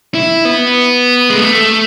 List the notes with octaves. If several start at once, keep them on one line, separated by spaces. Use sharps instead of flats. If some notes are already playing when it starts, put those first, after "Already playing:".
E4
B3
G#3
A3